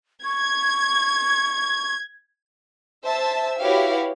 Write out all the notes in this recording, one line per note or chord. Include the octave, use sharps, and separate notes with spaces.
C#6 G#6
C5 E5 A5 E6
E4 F#4 G4 B4 C#5 F5